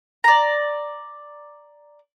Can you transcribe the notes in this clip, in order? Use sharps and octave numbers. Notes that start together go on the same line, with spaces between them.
D5 A#5